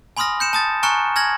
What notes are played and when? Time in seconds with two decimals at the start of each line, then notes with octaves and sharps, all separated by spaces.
0.17 G#5 B5 C6 D#6 F6 A#6
0.40 G6 C#7 E7
0.53 A5 D#6 A6
0.83 G#5 A#5 C#6 F6 F#6 C#7
1.16 G#5 F6 G#6 A#6 F#7